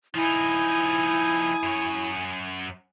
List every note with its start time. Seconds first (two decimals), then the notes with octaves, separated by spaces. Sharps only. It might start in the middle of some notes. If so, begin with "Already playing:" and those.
0.15 F3 D#4 E4 G#5 D#6
1.63 F#2 C#5